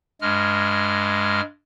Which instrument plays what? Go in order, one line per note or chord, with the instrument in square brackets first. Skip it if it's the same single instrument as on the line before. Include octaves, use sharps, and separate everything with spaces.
[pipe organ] G2 G#3 F6